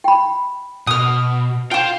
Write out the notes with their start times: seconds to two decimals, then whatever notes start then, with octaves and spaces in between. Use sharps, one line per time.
0.04 G5 B5
0.87 B2 D#6 F6
1.71 F4 C5 F5 G5